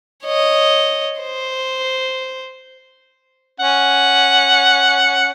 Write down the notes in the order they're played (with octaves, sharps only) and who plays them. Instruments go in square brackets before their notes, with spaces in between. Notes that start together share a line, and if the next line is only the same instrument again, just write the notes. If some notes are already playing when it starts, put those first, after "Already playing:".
[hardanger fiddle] C#5 D#5
C5
[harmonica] C#4 F#5